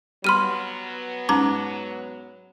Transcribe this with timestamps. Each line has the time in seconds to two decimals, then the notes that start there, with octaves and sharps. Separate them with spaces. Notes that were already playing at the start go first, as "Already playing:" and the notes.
0.24 F#3 G3 B3 B5 C6 F6 D#7
1.29 G#2 C#4 A#5 D6